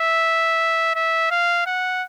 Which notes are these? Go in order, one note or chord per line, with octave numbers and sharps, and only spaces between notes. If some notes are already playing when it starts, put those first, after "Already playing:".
Already playing: E5
E5
F5
F#5